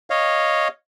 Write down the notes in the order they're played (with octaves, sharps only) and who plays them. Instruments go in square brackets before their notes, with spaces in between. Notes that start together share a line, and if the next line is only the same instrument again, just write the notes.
[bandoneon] C#5 D#5 F5